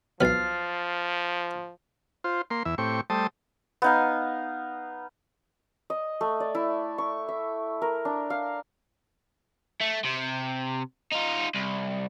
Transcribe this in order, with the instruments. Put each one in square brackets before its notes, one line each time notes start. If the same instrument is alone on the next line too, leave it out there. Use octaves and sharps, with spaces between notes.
[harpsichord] B1 B3 [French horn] F3 [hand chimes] F6 A6 C7
[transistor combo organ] F4 C5
A#3 C6
E2 E5
A2 C4 G4 C#6
G3 A3 C5 A5 D#6
[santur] B3 D#4 F5
D#5
A3
D5
E4
C#6
E5
A#4
D4
F5
[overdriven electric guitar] A3
C3
D#4 F4
C2